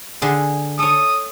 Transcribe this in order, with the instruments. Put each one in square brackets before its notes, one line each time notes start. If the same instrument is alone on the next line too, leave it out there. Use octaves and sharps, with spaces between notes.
[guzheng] D3 D4 G#4
[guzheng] A4 C#5 [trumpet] D#6